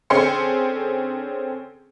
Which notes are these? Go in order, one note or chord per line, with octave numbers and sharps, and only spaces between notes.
D3 C4 C#4 G#4 C6 C#7